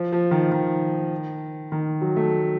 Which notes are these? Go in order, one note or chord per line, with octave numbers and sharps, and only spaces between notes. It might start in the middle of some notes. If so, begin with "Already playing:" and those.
Already playing: F3
F3
D#3
D#3
D#3
F#3
A3